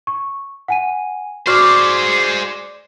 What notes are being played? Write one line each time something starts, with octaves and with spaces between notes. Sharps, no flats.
C#6
F#5 G#5 D#7
F#4 G#4 C5 D5 C#6 F6